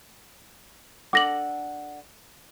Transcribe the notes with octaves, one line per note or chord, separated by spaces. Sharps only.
D4 A4 F#5 D6 A#6 F#7